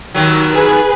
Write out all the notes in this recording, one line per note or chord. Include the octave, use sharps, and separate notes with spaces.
D#2 D#3 F#3
G#4 B4